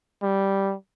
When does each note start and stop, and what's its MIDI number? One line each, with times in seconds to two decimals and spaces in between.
0.22 0.75 55